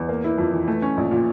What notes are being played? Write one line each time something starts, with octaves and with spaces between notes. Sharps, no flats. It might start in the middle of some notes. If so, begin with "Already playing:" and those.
Already playing: E2
A#3
E4
F2
E3
A3
C#4
A#1
A#2